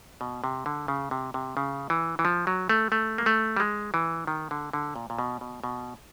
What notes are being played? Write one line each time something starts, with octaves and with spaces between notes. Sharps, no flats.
B2
C3
D3
C#3
C3
C3
C#3
E3
E3
F3
F#3
A3
A3
A#3
A3
G3
G#3
E3
D#3
D3
D3
A#2
A#2
B2
B2
B2